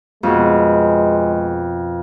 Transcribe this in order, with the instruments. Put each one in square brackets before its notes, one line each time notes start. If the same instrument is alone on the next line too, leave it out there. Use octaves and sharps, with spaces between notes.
[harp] F2 B2 [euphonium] G#3